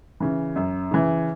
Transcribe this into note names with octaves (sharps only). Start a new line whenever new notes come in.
C#3 E3
F#2
C#3 E3